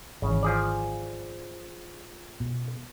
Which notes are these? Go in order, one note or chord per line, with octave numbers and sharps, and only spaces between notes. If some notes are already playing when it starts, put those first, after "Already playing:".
G#1 C#3 E3
F3 G#4 D5
B2